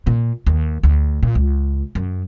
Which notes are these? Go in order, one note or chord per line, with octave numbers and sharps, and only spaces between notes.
A#2
D#2
D2
A#2
C#2
F#2